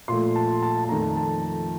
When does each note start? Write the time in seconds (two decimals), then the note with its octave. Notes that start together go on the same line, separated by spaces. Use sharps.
0.08 A#2 F3 A3 C6
0.36 A5
0.63 A5
0.84 A5
0.89 F2 D#3 A3 A#5
1.17 A5